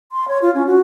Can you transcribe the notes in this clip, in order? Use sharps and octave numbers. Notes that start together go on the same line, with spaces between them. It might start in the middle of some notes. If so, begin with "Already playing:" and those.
C6
C#5
F4
C#4
F#4